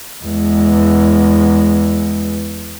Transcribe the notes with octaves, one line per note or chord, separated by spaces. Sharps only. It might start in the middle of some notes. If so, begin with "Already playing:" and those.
E2 G#3